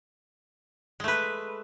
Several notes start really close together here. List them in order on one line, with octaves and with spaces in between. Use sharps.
G#3 A3 B4